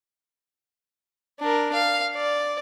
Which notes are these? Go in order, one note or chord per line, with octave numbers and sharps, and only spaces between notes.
D4 A#4
F5
D5